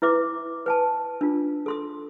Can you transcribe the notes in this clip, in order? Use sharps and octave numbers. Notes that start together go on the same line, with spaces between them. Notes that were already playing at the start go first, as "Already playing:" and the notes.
E4 B4 E5 D6
B4 G#5 A5
D4 F4
A4 C6 D#6